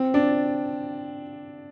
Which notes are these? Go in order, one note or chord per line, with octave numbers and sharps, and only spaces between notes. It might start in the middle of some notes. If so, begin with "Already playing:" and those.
Already playing: C4
D4